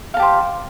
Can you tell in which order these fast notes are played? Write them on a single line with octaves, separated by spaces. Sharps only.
F5 A5 G4 C5